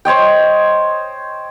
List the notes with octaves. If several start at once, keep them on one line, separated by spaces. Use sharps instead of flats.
C5 C#5 D#5 G5